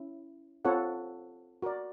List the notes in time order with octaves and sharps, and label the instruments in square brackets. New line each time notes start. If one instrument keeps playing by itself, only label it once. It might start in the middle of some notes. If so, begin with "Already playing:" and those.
Already playing: [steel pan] C#4 E4
C4 F4 A4 C#5 F#5
F#4 A#4 D5